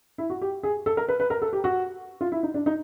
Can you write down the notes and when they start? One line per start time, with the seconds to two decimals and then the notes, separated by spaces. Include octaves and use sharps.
0.18 E4
0.30 F#4
0.42 G4
0.63 G#4
0.86 A4
0.97 A#4
1.09 B4
1.20 B4
1.30 A#4
1.42 A4
1.53 G4
1.64 F#4
2.21 F4
2.32 E4
2.43 D#4
2.54 D4
2.66 D#4